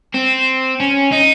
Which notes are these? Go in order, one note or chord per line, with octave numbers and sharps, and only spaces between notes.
C4
C#4
D#4